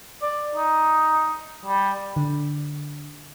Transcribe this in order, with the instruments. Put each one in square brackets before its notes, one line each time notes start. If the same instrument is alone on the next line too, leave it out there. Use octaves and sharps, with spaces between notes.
[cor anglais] D5
D#4
G3
[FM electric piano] D3